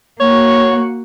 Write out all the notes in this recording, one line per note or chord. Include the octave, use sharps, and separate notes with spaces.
A#3 F#4 C#5